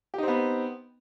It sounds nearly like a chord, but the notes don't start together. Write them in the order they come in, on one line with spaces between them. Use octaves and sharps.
G4 D#4 C4 B3